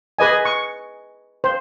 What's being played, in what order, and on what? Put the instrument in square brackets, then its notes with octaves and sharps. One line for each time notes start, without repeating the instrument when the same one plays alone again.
[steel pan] G#4 B4 D#5 G#5
C#6
C5